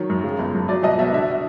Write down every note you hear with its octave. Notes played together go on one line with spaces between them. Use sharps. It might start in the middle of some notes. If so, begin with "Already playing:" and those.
Already playing: D#3 F#3 C#5
F#2
C#3
G1
F#2
F#3 D5
C2 D#5
B2 E5
D3 E5